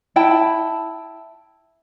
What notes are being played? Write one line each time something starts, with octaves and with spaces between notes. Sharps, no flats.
E4 G5 A5 B5